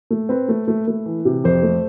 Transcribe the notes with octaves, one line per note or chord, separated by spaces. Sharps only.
A3
C4 B4
A3
A3
A3
E3
C3
F2 C5
A3